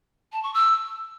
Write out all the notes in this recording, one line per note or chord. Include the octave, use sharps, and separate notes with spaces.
A5
C#6
E6